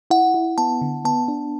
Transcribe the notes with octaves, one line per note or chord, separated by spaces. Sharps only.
E4 F#5
E4
B3 A5
D3
B3 A5
D4